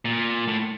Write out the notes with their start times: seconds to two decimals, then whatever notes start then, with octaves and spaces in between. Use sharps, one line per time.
0.05 A#2
0.48 A2